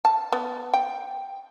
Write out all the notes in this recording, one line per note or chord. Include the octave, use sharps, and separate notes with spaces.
A5
B3
G5